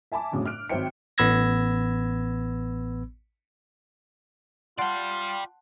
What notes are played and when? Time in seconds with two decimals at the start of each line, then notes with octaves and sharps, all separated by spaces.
0.12 E5 G#5 A5 B5 D6
0.32 G1 F2 A2 C#3 F#3
0.45 F6 F#6 D7
0.69 G#1 F#3 C5 E5 G5 C#7
1.18 A1 B3 B5 E6 G#6 A#6
4.78 F4 D5 F#5 G5 A5 C6